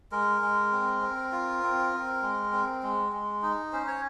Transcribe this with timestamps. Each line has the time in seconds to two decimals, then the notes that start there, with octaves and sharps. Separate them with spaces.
0.12 G#3 A#4
0.41 G#3
0.72 C4
1.01 C4
1.32 F4
1.63 C4
1.93 C4
2.22 G#3
2.52 C4
2.83 G#3
3.12 G#3
3.42 D#4
3.72 C#4 C5
3.87 C#5